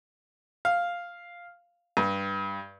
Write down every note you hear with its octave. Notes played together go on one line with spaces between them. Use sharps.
F5
G2